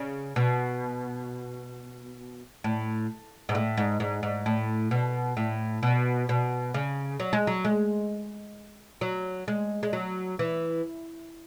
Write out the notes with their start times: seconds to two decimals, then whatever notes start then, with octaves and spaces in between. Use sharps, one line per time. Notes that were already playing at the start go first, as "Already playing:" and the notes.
Already playing: C#3
0.36 B2
2.64 A2
3.49 G#2
3.55 A2
3.77 G#2
4.00 G#2
4.23 G#2
4.46 A2
4.91 B2
5.37 A2
5.83 B2
6.29 B2
6.74 C#3
7.20 F#3
7.33 G#3
7.47 F#3
7.65 G#3
9.01 F#3
9.48 G#3
9.83 G#3
9.93 F#3
10.39 E3